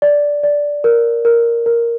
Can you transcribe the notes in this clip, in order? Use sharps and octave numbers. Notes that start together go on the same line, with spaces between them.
D5
D5
A#4
A#4
A#4